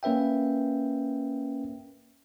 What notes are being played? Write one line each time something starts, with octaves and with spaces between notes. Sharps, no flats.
A#3 C#4 B4 E5 G5